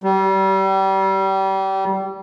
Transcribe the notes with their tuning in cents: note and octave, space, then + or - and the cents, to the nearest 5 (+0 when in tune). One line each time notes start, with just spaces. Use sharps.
G3 -30